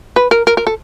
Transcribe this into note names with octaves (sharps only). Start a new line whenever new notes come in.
B4
A#4
A#4
A#4
A4